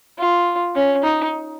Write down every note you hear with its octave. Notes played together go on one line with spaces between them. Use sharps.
F4
C#4
D#4